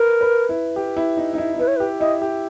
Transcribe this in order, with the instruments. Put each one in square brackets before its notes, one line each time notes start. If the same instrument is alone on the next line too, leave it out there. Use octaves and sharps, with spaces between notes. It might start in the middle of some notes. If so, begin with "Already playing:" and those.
Already playing: [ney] A#4 [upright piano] B4
[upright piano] B4
E4
G4
E4
D#4
D#4
E4
D#4
[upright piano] E4 [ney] B4
[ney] C#5
B4
[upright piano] G4
[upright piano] E4 [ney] D#5
[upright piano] G4